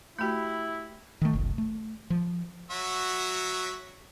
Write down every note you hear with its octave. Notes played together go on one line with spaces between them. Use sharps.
A3 E4 F#4 G4 B5
D#3 A3
F#1 C2
A3
F3
F#3 F#4 E5